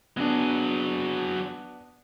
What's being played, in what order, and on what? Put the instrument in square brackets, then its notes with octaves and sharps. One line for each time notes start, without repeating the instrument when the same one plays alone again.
[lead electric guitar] F#3 G#4 [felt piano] B3 D4